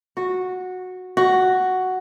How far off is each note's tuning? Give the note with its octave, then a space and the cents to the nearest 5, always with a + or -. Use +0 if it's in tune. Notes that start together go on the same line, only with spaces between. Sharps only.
F#4 -10
F#4 +5